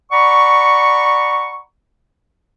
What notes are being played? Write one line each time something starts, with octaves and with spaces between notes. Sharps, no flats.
D5 F#5 A#5 B5 C#6